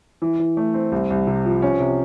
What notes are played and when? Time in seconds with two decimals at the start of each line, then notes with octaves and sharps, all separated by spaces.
0.22 E3
0.39 E3
0.57 A3
0.74 C4
0.92 C2
1.10 C2
1.27 C3
1.45 F3
1.62 C#4
1.80 C3